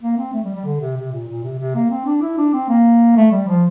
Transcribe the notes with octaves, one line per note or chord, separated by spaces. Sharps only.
A#3
C4
A3
G3
G3
D3
C3
C3
A#2
A#2
C3
C3
A#3
C4
D4
E4
D4
C4
A#3
A3
G3
F3